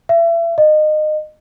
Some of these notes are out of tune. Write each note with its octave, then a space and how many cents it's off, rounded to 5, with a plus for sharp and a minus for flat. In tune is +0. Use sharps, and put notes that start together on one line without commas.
E5 +35
D#5 -25